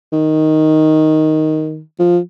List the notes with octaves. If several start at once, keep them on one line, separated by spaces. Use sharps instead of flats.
D#3
F3